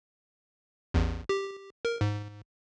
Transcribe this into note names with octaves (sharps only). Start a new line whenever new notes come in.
A1 E2
G4
A#4
G#2